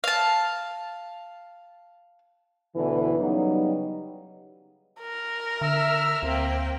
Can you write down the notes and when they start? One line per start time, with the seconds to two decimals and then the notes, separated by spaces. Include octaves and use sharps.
0.04 F5 A5
2.75 D2 B2 D3 E3
3.18 C#3 F#3 G3 B3 D#4
5.01 A#4
5.61 D3 E5 E6 F6
6.23 D2 A#3 C4 G5